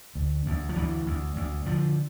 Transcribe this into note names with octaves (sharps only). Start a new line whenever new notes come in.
D2
D2
F3
D2 E3
D2
D2
D3 F3